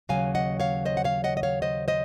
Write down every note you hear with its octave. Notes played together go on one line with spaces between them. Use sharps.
D#2 C#3 F#3 F5 G#5
D#5 F#5
C#5 F5
C5 D#5
F#5
C#5 F5
D#5 F#5
D#5
C#5 F5
C5 D#5
C5 D#5